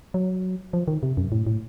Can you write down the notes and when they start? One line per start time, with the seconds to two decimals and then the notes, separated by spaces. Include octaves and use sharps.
0.14 F#3
0.73 F3
0.88 D#3
1.03 C3
1.17 F#2
1.32 A2
1.47 A2